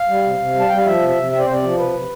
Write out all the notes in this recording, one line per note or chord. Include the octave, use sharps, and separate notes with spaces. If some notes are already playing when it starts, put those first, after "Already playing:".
Already playing: F5
G3
C3
C3
G3
A5
G3 G5
F5
F3 E5
C3
E5
C3
C4 E5
D5
C3 C5
D5
F3
C3 B4
C3